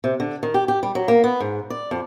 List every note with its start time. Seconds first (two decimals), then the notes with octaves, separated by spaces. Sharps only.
0.04 C3
0.20 D3
0.43 D#3
0.54 G4
0.68 G4
0.83 G3
0.95 F#3
1.08 A#3
1.24 B3
1.40 G#2
1.70 D5
1.91 F2